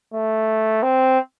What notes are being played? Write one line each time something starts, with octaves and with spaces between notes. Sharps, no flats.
A3
C4